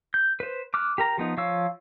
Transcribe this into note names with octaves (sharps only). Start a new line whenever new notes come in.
G6
B4 C5
D6 F6 F#6
G4 A#4 A#5
F3 B3 D#4
F3 C#5 F5 E6